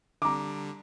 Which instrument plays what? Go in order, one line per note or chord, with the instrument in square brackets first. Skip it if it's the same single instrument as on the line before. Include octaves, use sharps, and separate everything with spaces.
[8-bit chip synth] D3 G3 [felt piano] A#5 D6